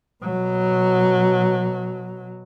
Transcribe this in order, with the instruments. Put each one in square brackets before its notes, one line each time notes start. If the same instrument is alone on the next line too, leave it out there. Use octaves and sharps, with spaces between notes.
[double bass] B2 F#3